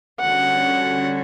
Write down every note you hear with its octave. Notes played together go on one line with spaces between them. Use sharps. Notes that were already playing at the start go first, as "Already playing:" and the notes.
D3 G3 C#4 F#4 F#5